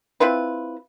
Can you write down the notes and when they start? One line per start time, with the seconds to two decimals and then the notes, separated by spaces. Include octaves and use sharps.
0.20 C4 E4 F4 B4